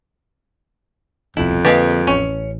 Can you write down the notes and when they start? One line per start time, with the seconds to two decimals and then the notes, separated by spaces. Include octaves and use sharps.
1.37 D#1 C2 F2 B2 E4
1.65 D3 F3 A#3 G4 G#4 B4 D#5 F5
2.07 A1 C#4